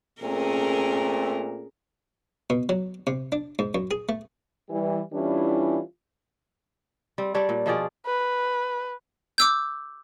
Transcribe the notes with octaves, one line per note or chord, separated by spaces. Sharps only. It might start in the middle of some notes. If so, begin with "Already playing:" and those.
A#2 A3 C4 C#4 G#4 A#4
B2
F#3
C3
D4
G#2
F#2
G#4
A3
E3 G3
E3 G3 C#4 D4 E4 F4
G3 C4
G3 D4 C#5
A#2
B2 F3 G#4 D5
B4
D6 E6 G6